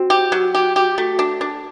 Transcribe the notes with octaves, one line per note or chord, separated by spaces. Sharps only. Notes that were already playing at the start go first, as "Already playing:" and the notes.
Already playing: C4 F#4
G4
F#3
G4
G4
A3
D4
D4